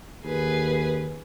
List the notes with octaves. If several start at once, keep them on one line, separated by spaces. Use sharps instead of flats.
D#2 G#4 B4